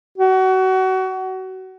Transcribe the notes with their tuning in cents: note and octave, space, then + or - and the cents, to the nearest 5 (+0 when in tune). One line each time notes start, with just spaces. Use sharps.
F#4 +25